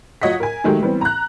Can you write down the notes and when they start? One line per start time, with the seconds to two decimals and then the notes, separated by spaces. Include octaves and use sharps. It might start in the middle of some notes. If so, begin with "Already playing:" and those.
0.22 F#3 F4 C#5 D#5 F#5 B6
0.40 A#4 G#5
0.64 D#3 F#3 G#3 A3 G4 A#4
0.81 E3 G3 B3 C4
1.01 A#5 F#6